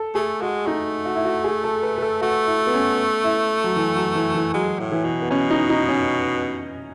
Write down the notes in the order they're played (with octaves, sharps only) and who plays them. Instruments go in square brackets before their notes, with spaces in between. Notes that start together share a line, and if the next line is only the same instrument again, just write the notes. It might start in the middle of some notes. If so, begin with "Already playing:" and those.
Already playing: [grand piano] A4
[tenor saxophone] A3 [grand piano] G#4
[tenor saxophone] G#3 [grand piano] F#4
[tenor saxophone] A3 [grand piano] D#4
[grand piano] F#4
E4
F#4
G#4
A4
B4
B4
A4
[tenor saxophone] A3 [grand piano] F#4
[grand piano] E4
B3
C#4
E4
F#3
E3
F#3
E3
E3
[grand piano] F#3 [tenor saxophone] G#3
[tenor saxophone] A2
[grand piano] E3
[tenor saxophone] B2
[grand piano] B3
[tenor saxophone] B2 [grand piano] C#4
[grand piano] D#4
D#4
C#4